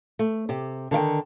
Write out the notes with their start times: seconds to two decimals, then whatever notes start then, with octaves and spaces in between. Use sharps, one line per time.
0.19 A3
0.49 C3 G4
0.91 D3 D#3 F5 G5